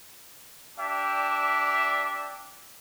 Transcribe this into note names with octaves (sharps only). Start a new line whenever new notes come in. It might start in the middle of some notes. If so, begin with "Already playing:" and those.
D4 G4 D5 E5